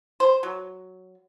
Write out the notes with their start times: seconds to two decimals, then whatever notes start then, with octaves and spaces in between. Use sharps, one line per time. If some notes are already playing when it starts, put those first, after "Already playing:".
0.20 C5
0.43 F#3